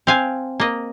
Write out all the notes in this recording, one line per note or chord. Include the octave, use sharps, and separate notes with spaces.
C4 F5 G#5
A#3 D#5